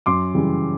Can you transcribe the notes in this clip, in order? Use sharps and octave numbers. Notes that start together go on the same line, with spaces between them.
F#2 C6 D6
C#3 E3 G3